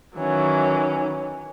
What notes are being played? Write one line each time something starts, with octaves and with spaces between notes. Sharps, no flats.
D#3 E3 F#3 C#4